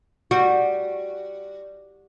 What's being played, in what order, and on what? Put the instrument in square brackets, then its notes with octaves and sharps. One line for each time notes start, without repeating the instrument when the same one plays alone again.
[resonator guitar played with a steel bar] G3 [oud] F#4